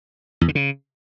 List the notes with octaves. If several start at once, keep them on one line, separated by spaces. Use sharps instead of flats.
E2
D3
C#3